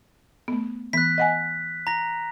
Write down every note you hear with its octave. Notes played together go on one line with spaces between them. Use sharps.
A3 B3
E3 B3 F#6 B6
D#5 F#5 G#5
A#5 A#6